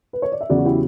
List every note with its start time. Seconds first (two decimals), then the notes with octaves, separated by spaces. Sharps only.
0.13 B4
0.22 C#5
0.32 D5
0.41 E5
0.49 E2 C#3 F#3 D5 F#5
0.59 F#4
0.65 E4 G4